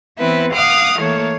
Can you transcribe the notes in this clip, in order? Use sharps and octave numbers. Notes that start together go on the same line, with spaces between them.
E3 B3 C4 E4 B4
F5 F#5 D6 D#6 F6
E3 A3 A#3 C#5